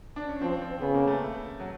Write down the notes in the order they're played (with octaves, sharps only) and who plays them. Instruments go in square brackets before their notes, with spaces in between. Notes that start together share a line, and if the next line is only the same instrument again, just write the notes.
[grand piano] D4
C#4
[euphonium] F3 [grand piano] C4
[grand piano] C4
[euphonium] C#3 [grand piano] B3
[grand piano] A#3
A3
F#3